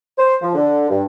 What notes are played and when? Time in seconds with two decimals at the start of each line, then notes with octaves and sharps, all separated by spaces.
0.18 C5
0.42 F3
0.55 D3
0.90 G2